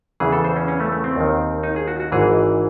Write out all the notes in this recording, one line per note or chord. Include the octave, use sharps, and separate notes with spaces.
E2 C#3 E3 G#4
A4
C5
C#4
C#4
A3
A3
C4
D#2 D#3
D#4
G#4
F#4
F#4
G#1 G#2 E3 G#4